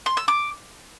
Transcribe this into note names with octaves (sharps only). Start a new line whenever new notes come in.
C6
E6
D6